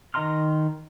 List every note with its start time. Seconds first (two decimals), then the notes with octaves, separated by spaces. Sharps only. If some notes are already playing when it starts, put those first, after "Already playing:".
0.14 D#3 D#5 A#5 C6 F6